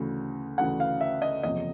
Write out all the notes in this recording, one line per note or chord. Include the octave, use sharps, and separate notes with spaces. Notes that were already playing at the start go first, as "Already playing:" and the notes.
Already playing: D2 C#3 E3
D2 C#3 E3 F#5
F5
E5
D#5
F#1 E2 C3 F3 D#5